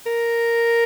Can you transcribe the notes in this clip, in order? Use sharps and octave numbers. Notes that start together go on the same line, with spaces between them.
A#4